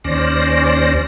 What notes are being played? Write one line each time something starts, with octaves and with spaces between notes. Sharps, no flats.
D#2 C#4 C5 D5 A#6